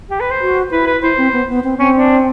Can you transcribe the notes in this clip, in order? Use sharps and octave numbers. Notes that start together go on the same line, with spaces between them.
G4
B4
C5
F#4
E4 B4
B4
E4 C5
C4
B3
B3
C4
C4 C#4
D4